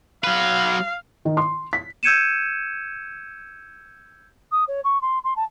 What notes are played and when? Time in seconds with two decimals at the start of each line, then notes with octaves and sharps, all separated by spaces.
0.24 F#3 B4 F5
1.25 D#3
1.37 C6
1.73 B6
2.03 E6 G6 G#6 C#7 D#7 E7
4.52 D#6
4.68 C#5
4.84 C#6
5.02 C6
5.24 C6
5.36 A5